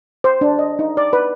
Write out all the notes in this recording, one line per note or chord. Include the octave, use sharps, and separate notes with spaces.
C5
D4
D#5
D#4
D5
B4